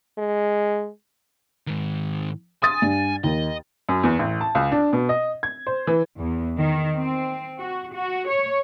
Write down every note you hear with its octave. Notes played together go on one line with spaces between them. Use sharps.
G#3
G#2 D#3
G#5 C6 D#6 A6
G2
D#2 D#5
F#2
E2
A1
A5
C#2
D4
B2
D#5
G#6
C5
E3
E2
D#3
C4
F#4
F#4
C#5